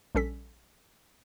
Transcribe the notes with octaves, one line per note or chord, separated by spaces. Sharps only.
A#1 G3 C#4 A4 B6